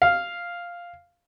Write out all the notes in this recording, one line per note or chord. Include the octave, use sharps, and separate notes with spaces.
F5